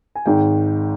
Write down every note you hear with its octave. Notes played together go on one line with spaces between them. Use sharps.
G#5
G#1 G#2 D#3 G5